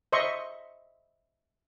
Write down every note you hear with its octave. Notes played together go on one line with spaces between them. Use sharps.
C5 D#5 E5 C6 C#6